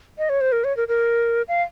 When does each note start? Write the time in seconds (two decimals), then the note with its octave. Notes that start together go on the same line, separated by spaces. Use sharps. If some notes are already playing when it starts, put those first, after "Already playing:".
0.18 D#5
0.29 C#5
0.41 C5
0.52 A#4
0.64 C#5
0.77 A#4
0.88 A#4
1.48 F5